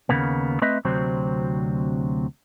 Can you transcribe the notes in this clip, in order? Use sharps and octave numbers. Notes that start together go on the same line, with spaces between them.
D#2 G#2 C#3 A#3 B3
A3 C4 B4 D#5 E5
D2 C3 F#3 C4 C5